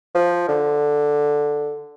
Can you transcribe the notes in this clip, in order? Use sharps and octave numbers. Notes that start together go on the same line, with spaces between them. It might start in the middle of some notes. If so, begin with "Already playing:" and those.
F3
D3